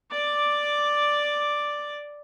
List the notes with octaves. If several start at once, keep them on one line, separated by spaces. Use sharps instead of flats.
D5 D6